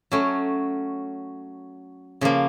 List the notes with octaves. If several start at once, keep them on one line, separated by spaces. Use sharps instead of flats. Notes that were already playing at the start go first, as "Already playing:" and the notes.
F#3 A3 C#4
C#3 F3 A#3